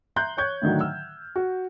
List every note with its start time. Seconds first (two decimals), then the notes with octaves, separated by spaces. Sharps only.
0.16 E5 A#5 C6 F#6 G6
0.37 C#5 C#6 G6 G#6
0.62 A2 D3 D#3 F#3
0.80 E6 F6
1.36 F#4